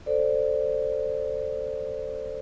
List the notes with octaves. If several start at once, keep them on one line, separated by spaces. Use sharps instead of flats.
A4 C5 D5